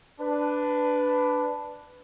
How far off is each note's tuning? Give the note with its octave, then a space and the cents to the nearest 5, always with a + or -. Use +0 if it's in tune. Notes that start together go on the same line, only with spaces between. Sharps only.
D4 +0 B4 +10